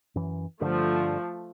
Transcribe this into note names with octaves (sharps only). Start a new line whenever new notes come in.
F#2 E3
G2 D3 F3 A3